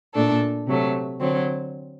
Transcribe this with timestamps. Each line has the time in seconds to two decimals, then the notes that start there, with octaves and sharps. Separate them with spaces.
0.14 A#2 A3 D4 A4
0.67 C3 F#3 A3
1.20 D3 F#3 C4